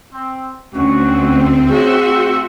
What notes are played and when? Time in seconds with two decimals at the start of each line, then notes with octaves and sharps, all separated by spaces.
0.13 C4
0.74 D2 C4 C#4 F#4
1.69 A3 C#4 F#4 G#4 C5 E5
2.05 A3 C4